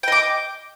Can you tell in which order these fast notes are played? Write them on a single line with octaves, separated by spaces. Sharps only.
G5 D#5 D6